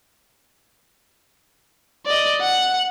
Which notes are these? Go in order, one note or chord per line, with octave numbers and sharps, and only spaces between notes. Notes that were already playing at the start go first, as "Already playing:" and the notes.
D5 D#5
F#5